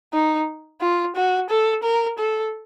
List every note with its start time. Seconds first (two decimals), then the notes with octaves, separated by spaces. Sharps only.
0.14 D#4
0.81 F4
1.16 F#4
1.50 A4
1.83 A#4
2.19 A4